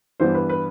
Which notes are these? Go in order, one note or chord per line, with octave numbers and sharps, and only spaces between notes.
G2 E3 B3 D4 C5
B4
B4